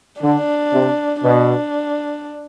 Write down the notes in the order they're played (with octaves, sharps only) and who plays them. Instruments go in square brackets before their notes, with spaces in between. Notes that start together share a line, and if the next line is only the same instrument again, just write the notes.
[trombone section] D3 [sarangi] D4
[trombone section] C3
[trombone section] B2 [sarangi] D4